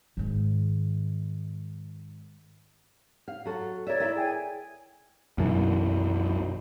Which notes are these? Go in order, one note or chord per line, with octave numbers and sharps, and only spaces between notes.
G#2 D#3
F5
F#3 A4
A#4 C#5 D5 E5
E4 A#4 E5
G#4 G5 G#5
B1 F#2 E3